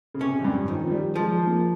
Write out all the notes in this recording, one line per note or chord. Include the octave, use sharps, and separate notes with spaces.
C#3
C3 C#4
F2
G2
D#3 F3
F3
G3
F3 G#3
A#3